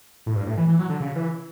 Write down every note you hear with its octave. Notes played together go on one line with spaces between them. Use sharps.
A2
G2
A2
E3
E3
F#3
D3
C#3
E3